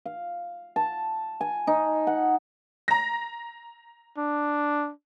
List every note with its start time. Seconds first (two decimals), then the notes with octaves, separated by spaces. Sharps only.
0.06 F5
0.76 A5
1.41 G#5
1.67 D#4
2.07 F#5
2.88 A#5 A#6
4.18 D4